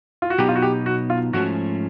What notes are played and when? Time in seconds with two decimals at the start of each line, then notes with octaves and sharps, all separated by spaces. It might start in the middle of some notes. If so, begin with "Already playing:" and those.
0.22 F4
0.30 F#4
0.38 B2 F#3 B3 D#4 G4
0.49 F4
0.56 F#4
0.62 G4
0.86 F#4
1.10 F4
1.33 G#2 F3 A3 C#4 F#4